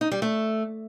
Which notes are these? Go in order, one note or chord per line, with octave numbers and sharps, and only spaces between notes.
D#4
G3
A3